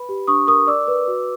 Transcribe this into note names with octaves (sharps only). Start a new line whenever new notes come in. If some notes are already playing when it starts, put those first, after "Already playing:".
Already playing: B4 B5
G4
D4 C#6 D#6
A#4 C#6 D#6
D5 D6 E6
B4
F#4